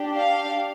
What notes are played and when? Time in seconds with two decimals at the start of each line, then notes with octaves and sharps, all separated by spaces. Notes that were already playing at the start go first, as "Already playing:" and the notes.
Already playing: D4 G4
0.17 F5